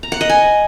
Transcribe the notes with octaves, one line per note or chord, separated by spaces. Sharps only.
A#5
F#5
D#5
G#5